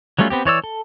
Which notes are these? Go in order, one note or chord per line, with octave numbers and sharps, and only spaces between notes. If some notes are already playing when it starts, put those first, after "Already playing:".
F#3 G3 A3 C#4 F4
B3 C4 G4
E3 C#5 D5 E6
A4